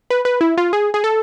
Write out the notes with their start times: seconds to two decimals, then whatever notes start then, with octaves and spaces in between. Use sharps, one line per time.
0.10 B4
0.25 B4
0.41 E4
0.57 F4
0.73 G#4
0.94 G#4
1.04 A4